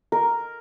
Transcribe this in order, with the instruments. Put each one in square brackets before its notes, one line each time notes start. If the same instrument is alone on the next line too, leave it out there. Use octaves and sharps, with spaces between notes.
[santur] A#4